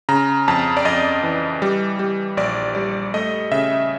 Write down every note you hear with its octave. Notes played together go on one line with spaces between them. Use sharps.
C#3 A#5
F2 A5
D5
F2 D#5
E3
G3
G3
A#1 D5
G3 D5
A3 D#5
C#3 E5